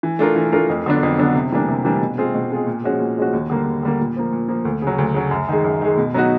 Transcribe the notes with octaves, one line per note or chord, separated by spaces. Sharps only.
E3
A3 D4 F4 A#4
E3
A3 D4 F4 A#4
F2
D3 F#3 B3 D4
F2
D3 F#3 B3 D4
C3
E3 G3 A#3 D4
C3
E3 G3 A#3 D4
B2
G#3 C4 F4 G#4
B2
G#3 C4 F4 G#4
A#2
F3 G#3 C#4 F#4
A#2
F3 G#3 C#4 F#4
D#2
D3 G3 A#3
D#2
D3 G3 A#3
A#2
F3 A#3
A#2
F3 A#3
D2
C#3 F#3
D2
C#3 F#3
F#2
D#3 G#3
F#2
D#3 G#3
B2
F#3 B3 D#4 F#4